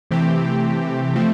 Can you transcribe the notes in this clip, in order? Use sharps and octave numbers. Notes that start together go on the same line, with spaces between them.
C3 E3 A3 C4 G4
F3 A3 C4